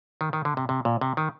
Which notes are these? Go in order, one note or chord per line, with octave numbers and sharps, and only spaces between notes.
D#3
D#3
D3
C3
C3
A#2
C3
D#3